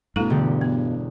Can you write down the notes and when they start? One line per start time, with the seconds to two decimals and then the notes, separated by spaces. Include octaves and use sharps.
0.16 G2 B2 A3 E4 A4 A#5
0.30 E1 D3 G4
0.61 B3